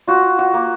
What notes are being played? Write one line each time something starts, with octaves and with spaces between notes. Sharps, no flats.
F4 F#4
F#4
A#3